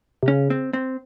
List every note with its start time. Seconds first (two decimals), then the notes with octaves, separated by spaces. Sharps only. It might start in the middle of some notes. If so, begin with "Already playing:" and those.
0.23 C3
0.27 C#3 C#4
0.50 C4
0.73 C4